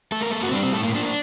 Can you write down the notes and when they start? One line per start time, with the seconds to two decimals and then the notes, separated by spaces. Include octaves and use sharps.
0.12 A3 A4
0.23 A#4
0.32 A#3 A4
0.43 F#4
0.49 C4
0.53 G3 D4
0.63 C4
0.73 A2 A4
0.83 A#3
0.94 A#3 D4
1.05 D4